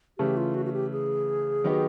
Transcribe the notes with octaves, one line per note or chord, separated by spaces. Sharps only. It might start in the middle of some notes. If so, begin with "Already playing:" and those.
C#3 E3 A3 G4
F4
F#4
F#4
G4
G#4
D#3 F#3 B3 D#4 G4